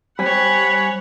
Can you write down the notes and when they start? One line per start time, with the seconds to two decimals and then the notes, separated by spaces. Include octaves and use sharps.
0.19 G3 C4 C#5 F#5 G#5 B5